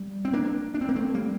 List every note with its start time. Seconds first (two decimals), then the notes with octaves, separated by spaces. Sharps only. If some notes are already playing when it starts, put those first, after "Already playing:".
Already playing: G3
0.25 C4
0.33 A#3 D4
0.74 D4
0.81 C4
0.89 A#3
0.96 A3 C4
1.14 G3 A#3